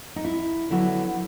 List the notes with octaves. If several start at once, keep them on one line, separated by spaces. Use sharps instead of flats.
D#4
E4
D3 F#3 B3 E4